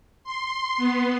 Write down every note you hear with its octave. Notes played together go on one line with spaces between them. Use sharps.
C6
B3